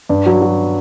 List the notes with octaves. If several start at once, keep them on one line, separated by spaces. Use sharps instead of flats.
G2
F#3
F#3